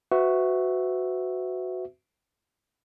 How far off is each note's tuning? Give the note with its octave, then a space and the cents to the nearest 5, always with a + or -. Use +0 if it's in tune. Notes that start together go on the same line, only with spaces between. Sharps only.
F#4 +0 B4 +35 E5 +0